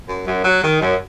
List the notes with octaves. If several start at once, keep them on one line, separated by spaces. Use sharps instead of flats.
F#2
F#2
F#3
D#3
F#2